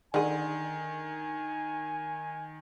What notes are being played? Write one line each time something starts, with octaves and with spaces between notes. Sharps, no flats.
D3 D#3 G#4 G#5